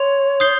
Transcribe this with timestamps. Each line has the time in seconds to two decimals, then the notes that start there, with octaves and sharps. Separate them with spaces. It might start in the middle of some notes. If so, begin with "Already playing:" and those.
Already playing: C#5 C6 F7
0.40 D#6 G6 C7 G7